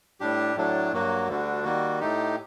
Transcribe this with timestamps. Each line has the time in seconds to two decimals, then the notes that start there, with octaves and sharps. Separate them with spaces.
0.20 A2 G3 D4 G4
0.56 A2 F#3 A3 D4
0.92 G2 F#3 A#3 F#4
1.28 D2 D3 G3 D4 F#4
1.64 D#3 G3 A#3 F#4
2.00 A2 A3 D#4 G4